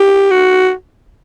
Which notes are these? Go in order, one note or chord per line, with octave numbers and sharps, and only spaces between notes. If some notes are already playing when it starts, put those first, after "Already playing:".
Already playing: G4
F#4